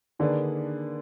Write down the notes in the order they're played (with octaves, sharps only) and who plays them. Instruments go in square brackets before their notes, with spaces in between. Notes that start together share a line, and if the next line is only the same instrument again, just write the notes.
[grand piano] D3 [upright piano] D#3 A#3 D4 G#4 B4